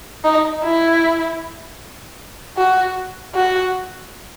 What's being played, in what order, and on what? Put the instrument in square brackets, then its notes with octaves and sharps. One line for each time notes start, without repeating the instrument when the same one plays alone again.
[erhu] D#4
E4
F#4
F#4